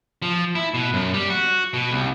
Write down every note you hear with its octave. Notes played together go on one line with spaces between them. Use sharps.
F3
E4
B2
F#2
G3
F#4
B2
C2